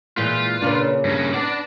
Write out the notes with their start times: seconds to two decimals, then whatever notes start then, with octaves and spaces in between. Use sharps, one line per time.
0.17 A#2 E3 G#3 F4 G6 B6
0.62 A#2 C#3 A#3 D4 B4
1.05 G2 C#4 A#6
1.34 B3 D4 D5